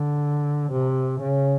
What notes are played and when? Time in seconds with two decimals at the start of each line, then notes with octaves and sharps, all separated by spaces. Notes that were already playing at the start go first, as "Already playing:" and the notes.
Already playing: D3
0.72 C3
1.21 C#3